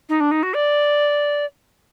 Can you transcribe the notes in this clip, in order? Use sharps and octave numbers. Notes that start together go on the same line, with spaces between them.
D#4
D4
D#4
F#4
D5